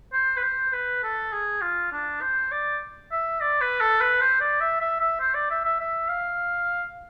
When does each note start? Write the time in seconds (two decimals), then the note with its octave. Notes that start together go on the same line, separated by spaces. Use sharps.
0.13 C5
0.37 B4
0.43 C5
0.72 B4
1.03 A4
1.32 G#4
1.61 F4
1.92 D4
2.21 C5
2.51 D5
3.11 E5
3.41 D5
3.61 B4
3.81 A4
4.01 B4
4.21 C5
4.40 D5
4.61 E5
4.80 E5
5.00 E5
5.20 C5
5.34 D5
5.50 E5
5.64 E5
5.80 E5
6.09 F5